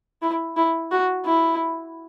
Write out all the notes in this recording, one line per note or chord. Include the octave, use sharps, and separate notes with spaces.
E4
E4
F#4
E4